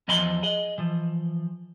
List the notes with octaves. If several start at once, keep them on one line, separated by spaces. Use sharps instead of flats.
E2 F3 D#5 G#5 B5 C6
G#4 D#5
E3 F3